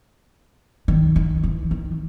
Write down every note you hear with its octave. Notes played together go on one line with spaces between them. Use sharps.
D#3
D#3
E3
D#3